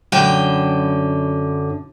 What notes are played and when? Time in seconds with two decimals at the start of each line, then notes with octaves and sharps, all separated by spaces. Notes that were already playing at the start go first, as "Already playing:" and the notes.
0.12 F#2 D3 G5